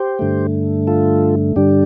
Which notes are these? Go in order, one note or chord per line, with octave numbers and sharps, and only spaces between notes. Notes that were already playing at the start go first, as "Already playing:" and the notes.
Already playing: G4 C5
G2 D3 A3
F4 A4
G2 D3 G3 D4 G4